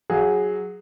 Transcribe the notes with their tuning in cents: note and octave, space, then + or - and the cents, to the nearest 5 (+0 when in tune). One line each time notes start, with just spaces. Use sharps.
F#3 +0 G#4 +0 F5 -30